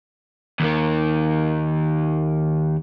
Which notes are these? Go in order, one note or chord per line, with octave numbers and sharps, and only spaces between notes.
D#2 D#3